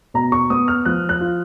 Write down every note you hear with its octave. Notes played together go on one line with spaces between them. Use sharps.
B2 A#5
C#6
B3 D#6
F6
F3 F#6
F#6
F4